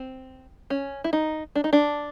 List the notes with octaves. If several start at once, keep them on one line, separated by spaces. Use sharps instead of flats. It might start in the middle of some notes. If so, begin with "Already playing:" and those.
Already playing: C4
C#4
E4
D#4
D4
D#4
D4